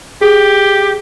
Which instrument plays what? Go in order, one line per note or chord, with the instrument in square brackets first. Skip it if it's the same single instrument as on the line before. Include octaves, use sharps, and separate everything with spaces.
[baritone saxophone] G4 [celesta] G#4